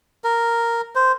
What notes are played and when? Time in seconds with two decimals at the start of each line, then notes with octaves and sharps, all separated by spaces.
0.24 A#4
0.95 C5